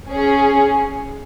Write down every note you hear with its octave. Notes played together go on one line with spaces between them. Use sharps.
C#4 G#4